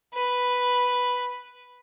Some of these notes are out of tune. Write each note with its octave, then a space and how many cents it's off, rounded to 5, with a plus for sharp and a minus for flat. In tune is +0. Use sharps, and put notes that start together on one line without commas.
B4 +0